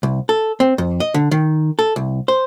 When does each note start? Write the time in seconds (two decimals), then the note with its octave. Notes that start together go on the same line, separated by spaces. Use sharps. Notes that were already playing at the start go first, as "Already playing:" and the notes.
0.03 C2
0.29 A4
0.60 C4
0.78 F2
1.00 D#5
1.14 D3
1.31 D#3
1.79 A4
1.96 C2
2.28 C5